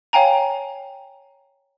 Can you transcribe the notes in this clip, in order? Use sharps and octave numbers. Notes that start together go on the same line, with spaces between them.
C#5 F5 G5 G#5 A#5